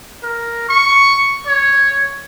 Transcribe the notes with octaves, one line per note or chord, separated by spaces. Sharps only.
A#4
C#6
C#5